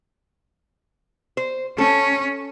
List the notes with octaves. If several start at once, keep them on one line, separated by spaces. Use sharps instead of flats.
C5
C#4 A4